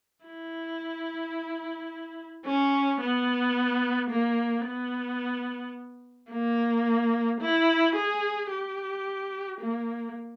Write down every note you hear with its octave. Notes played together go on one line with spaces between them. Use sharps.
E4
C#4
B3
A#3
B3
A#3
E4
G#4
G4
A#3